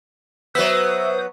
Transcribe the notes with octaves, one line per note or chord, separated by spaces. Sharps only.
F#3 B3 B4 C5 E5 D#6